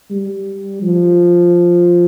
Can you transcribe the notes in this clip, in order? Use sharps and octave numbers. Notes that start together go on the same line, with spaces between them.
G3
F3